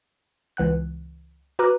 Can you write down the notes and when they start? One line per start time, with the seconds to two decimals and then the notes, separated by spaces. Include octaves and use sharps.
0.57 C#2 E3 F#5 F#6
1.59 F#4 B4 A#5 D6 F6 F#6